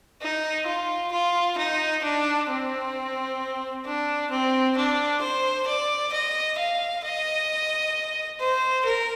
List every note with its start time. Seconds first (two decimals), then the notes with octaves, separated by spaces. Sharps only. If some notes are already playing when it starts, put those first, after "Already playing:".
0.22 D#4
0.67 F4
1.12 F4
1.58 D#4
2.04 D4
2.49 C4
3.86 D4
4.31 C4
4.77 D4
5.22 C5
5.68 D5
6.13 D#5
6.59 F5
7.04 D#5
8.40 C5
8.86 A#4